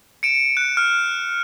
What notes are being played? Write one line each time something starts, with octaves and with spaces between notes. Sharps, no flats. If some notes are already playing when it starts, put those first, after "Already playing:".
C#7 D7 E7
F#6
F6